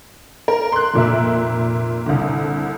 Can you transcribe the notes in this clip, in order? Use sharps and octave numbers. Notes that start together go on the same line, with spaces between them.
A#4
C6 F#6
F1 A#2 A#4 E5
C2 D3